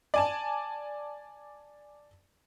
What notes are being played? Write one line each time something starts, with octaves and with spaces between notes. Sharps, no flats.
D5 G#5 A5